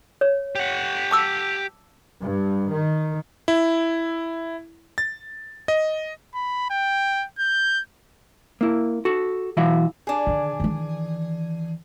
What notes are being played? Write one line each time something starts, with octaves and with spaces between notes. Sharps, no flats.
C#5
G4 F#5
A5 D6 E6
G2
D#3
E4
A6
D#5
B5
G5
G6
A#3 E4
F#4 A4
B1 E3 E4 F#4 E5 F5
D4 G#4
D3 D#3
D#3 E3